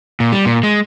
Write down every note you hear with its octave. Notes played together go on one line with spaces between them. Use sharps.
A#2
G3
A#2
G#3